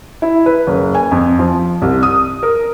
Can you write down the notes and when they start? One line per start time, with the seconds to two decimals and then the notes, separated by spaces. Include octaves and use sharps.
0.22 E4
0.46 B4
0.67 F#1
0.95 G#5
1.11 F2
1.39 F3
1.82 C2
2.03 D#6
2.43 A#4